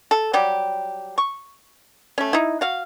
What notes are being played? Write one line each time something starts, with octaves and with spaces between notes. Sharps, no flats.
A4
F#3 G3 G4
C#6
A3 C#4
D#4 E4
F#4 F5